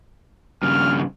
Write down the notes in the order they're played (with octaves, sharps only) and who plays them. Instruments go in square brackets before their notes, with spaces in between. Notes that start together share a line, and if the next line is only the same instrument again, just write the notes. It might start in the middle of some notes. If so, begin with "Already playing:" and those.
[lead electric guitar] G2 C#3 [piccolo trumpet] F6